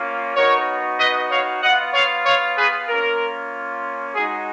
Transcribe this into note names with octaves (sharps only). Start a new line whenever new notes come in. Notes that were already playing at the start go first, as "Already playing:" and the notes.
Already playing: A#3 C#4 F4
B3 D#4 F#4 A#4 C#5
B4 D#5
C#5 F5
B3 F4 D#5 F#5
C#5 F5
C#5 F5
G#4 B4
A#3 C#4 F4 A#4
G#3 D#4 F#4 G#4